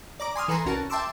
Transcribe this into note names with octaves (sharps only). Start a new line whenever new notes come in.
D5 A#5 D6
G#5 C6 D#6 F6
E3 A4 B4 G#5 A#5 C6
C2 C#4 F#4 A#4 A5
E5 G5 A5 C6 D6 E6